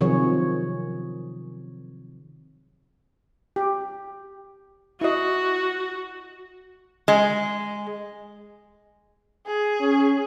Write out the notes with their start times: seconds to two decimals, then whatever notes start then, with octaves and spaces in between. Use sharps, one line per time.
0.01 C3 D#3 F3 F#3 G#4 C#5
3.56 G4
5.01 E4 F#4 D#5
7.08 G#3
9.47 G#4
9.80 C#4